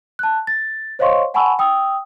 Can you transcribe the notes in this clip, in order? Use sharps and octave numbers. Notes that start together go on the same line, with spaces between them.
A5 F#6
A6
C5 C#5 D#5 F5 C6 C#6
F#5 G#5 A5 B5 C#6 E6
G5 D#6 E6